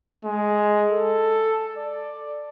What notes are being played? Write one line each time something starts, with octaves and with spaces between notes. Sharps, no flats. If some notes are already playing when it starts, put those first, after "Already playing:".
G#3
A4
D5